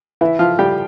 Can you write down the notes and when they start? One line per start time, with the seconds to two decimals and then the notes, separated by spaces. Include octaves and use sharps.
0.21 E3 E4
0.39 F3 F4
0.58 A2 G3 G4